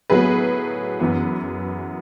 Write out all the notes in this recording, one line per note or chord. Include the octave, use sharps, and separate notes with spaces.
A2 F#3 B3 G#4 B4
F#2 E3 B3